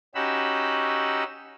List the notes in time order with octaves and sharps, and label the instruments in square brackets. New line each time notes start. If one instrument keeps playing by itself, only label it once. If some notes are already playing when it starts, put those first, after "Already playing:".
[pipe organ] C#4 D#4 F#4 G4 B5 E6